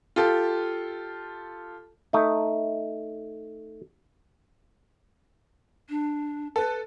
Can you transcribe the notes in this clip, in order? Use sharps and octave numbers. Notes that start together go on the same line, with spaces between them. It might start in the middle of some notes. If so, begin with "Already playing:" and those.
F4 G4 A4
A3 D#4
D4
A4 B4